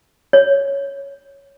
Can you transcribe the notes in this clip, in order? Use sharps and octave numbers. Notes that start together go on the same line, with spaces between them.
C#5